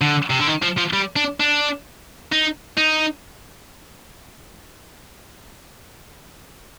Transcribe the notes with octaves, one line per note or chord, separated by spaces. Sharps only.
D3
C3
D3
D#3
F3
F3
G3
D4
D4
D#4
D#4